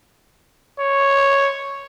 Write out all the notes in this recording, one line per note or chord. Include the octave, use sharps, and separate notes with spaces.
C#5